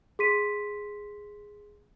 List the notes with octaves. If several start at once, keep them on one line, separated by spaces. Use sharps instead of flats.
G#4 C6 B6 D#7